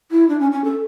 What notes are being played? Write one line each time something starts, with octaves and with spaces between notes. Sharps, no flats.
E4
D4
C#4
C#4
A4